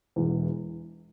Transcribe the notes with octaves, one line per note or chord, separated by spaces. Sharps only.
E1 E2 E3